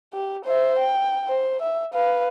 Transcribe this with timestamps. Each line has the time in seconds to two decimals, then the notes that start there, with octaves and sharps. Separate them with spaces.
0.13 G4
0.44 C5 E5
0.79 G5
1.28 C5
1.62 E5
1.94 B4 F5